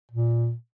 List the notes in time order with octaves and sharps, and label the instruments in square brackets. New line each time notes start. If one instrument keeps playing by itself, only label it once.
[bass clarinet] A#2